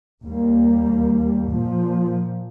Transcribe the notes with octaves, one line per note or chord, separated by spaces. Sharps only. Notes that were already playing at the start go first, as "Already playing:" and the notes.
D#2 G3 A#3
A#2 F3